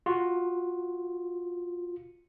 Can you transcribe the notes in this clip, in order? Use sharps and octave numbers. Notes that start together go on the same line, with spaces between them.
F4 F#4